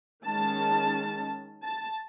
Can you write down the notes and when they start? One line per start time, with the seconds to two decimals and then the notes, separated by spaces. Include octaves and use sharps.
0.25 D#3 G#3 C#4 A5
1.64 A5